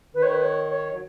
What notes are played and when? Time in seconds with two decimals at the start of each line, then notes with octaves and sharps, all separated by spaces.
0.14 D#3 B4
0.23 C#5
0.31 B4
0.42 C#5
0.69 C#5
0.92 F#3